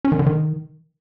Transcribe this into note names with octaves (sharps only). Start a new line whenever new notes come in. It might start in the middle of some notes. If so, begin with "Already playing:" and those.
C#4
D#3
D3
D#3